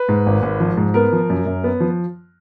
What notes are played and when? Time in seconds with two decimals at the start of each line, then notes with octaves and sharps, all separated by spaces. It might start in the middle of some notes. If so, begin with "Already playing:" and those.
Already playing: B4
0.09 G#2
0.26 G#1
0.42 G#1
0.60 F3
0.77 G#2
0.94 B3 A#4
1.12 F3
1.30 F#2
1.46 F#2
1.64 B3
1.80 F3